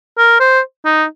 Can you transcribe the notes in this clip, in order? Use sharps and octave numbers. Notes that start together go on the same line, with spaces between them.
A#4
C5
D#4